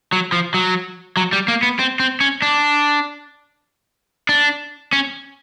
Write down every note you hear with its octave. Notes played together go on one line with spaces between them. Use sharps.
F#3
F3
F#3
F#3
G3
A#3
B3
C4
C4
C#4
D4
D4
C#4